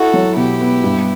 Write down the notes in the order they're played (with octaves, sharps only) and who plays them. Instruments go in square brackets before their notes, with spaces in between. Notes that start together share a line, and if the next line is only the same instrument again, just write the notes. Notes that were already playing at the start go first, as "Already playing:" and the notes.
Already playing: [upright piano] E4 [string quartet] F#4 A4
[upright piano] F#3
[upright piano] B2 [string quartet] E4 G4
[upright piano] B3
G2